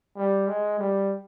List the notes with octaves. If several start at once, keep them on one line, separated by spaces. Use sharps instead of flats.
G3
G#3
G3